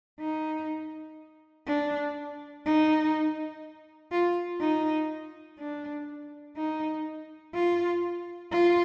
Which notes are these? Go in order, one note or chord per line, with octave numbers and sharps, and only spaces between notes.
D#4
D4
D#4
F4
D#4
D4
D#4
F4
F4